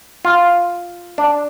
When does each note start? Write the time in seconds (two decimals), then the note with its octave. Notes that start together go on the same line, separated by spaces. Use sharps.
0.25 F4
1.18 D4